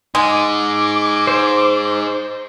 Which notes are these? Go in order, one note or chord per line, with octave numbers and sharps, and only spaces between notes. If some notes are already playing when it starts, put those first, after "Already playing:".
G#3 D#4 G#4 D6
C5